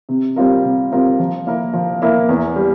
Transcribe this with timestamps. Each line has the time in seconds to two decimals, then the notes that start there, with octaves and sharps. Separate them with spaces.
0.09 C3
0.36 G3 C4 F4 A#4
0.64 C3
0.92 G3 C4 F4 A#4
1.19 F3
1.47 A#3 E4 A#4
1.73 F3
2.02 A#3 E4 A#4
2.29 E2
2.56 G3